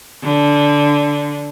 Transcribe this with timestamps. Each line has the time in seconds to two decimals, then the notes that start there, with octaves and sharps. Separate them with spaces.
0.23 D3